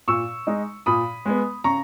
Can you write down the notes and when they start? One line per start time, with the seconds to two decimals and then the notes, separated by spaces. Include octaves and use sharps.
0.08 A#2 C#6 E6
0.47 G#3 D#4
0.86 A#2 B5 D#6
1.26 G#3 B3
1.64 C#3 A#5 C#6